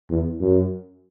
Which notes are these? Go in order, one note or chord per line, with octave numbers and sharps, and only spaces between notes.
E2
F#2